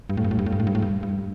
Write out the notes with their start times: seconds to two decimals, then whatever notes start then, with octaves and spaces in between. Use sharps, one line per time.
0.10 G2
0.17 A2
0.24 G2
0.31 A2
0.39 G2
0.46 A2
0.52 G2
0.60 A2
0.67 G2
0.75 A2
0.82 G2
1.03 G2